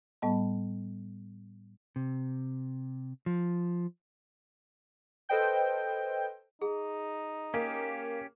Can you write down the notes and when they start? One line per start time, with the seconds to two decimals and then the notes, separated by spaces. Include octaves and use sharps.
0.22 A2 G3 B3 D#5 A5
1.96 C3
3.26 F3
5.29 A4 B4 C5 D#5 G5 G6
6.62 D#4 G#4
7.54 A#3 C#4 G4